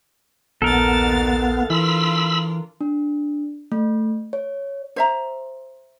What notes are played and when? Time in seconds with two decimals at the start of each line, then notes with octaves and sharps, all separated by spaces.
0.62 A#1 D#2 B3 A4 A#4 F5 A6
1.70 E3 D4 F4 B5 E6
2.81 D4
3.72 A3
4.33 C#5
4.96 C5 E5 A#5